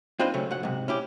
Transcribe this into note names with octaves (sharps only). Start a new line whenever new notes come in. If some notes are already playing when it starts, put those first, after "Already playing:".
C4 D4 D#4 F4 B4 C5
C#3 F#3 A3
F#2 F#5
G#2 C3
C#4 E4 G4